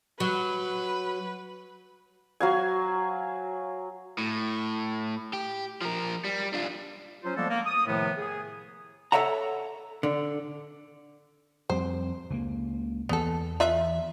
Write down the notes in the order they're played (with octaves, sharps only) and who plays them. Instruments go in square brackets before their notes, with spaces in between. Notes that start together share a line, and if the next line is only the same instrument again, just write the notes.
[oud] F#3 [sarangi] B4
[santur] F#3 F5 G#5
[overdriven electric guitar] A2
G4
F3 A#4
G3
D4 F4
[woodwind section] F#3 C#4 F4 C5
F3 G3 G#3 A#3 B3 A4
A#3
D#6
A2 C3 D#3 F3 A3 B3
G#4
[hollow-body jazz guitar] A4 B4 C#5 E5 F#5 A#5
D3
[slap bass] F2 G3 C4 [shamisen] C5
[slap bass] C#2 F#3 A#3
[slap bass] E2 E3 [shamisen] B3 A4
[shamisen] F4 B4 E5